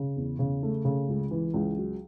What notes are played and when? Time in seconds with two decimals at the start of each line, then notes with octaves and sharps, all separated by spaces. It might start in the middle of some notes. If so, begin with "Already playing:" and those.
Already playing: C#3
0.16 E2
0.39 C#3
0.63 A3
0.85 C#3
1.08 C#2
1.31 E3
1.54 C#2
1.77 F#3